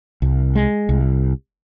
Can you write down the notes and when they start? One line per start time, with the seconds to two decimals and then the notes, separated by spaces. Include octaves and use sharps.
0.22 C2
0.55 G#3
0.89 C2